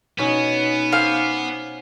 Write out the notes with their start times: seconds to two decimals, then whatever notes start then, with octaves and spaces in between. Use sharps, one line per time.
0.19 B2 B3 C#4 D#4
0.92 C5 F5 G#5 D6